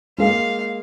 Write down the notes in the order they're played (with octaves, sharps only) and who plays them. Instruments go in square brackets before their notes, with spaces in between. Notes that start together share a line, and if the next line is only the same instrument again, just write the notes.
[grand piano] G#3 A#3 [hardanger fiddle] F5